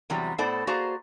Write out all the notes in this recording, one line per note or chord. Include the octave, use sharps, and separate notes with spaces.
E2 C3 F#3 G3
A2 B3 A4 C5 D5
A#3 F#4 G#4 C5 D5 A#5